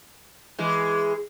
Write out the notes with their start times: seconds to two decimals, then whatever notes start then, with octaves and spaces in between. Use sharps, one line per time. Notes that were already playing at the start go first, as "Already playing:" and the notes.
0.59 E3 G#3